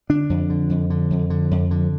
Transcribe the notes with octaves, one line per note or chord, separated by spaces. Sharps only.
D3 D4
F2
D3
F2
D3
F2
D3
F2
D3